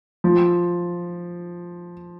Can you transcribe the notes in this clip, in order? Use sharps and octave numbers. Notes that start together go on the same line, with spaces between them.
F3